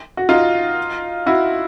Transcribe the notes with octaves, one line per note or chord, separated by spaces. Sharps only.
F#4
D#4 F4
E4 F#4